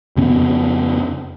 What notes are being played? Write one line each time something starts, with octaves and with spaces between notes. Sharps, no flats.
F2 C#3 B3 C#4